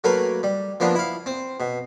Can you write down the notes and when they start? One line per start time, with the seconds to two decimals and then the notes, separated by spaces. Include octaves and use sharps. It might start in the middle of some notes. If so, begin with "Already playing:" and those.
0.04 F#3 A3 A#3 A#4 B4
0.43 G3
0.80 F3 A#3 B3 D4
0.95 E4 F5
1.26 C4
1.60 B2